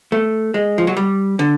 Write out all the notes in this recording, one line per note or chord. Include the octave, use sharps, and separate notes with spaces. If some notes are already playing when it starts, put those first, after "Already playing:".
A3
G#3
F3
F#3
G3
D3